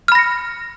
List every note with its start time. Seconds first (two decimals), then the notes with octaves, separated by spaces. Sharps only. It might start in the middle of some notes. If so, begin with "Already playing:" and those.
0.08 F6
0.12 B5
0.15 A#6
0.19 C#7